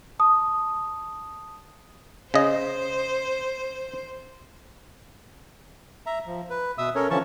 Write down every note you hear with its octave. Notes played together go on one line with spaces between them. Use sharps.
A5 D#6
C#3 C5 D#5
E5 A#5
F3
B4
B2 E5 D#6 E6
C#4 A4 A#4 C#5
D3 E3 F3 C#4 A5 C#6